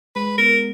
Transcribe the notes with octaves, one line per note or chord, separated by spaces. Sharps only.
G#3 B4
B3 A#4